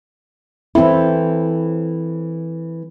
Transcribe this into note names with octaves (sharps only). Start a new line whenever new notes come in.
E3 C4 E4 A4